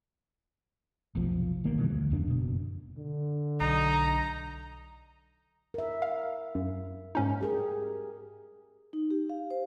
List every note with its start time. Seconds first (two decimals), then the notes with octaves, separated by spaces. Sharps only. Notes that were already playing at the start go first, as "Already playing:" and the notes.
1.15 F1 B1 F3
1.64 G1 D#3 A#3
1.78 B2 E3 G3
1.90 D2
2.10 D#1 F2 B3 D4
2.27 F#1 B2
2.97 D3
3.61 B1 D#4 A#5
5.74 A#4 E5
6.02 F5
6.55 F#2
7.15 G#2 C#4 D#4
7.41 G4 G#4 A#4
8.93 D#4
9.10 G4
9.30 F5
9.50 C5